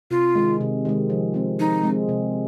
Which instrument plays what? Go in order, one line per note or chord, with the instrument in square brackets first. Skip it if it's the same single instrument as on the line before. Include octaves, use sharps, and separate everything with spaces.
[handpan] C3 [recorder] F4
[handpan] D#3 G#3
C3
D#3 G#3
F3
G#3 C4
[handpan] F3 [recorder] D#4
[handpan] G#3 C4
C3